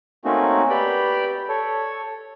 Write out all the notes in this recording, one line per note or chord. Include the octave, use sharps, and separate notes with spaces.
A3 A#3 C4 C#4 D#4 F#4
G4 B4 D5 G5 B5
A4 C#5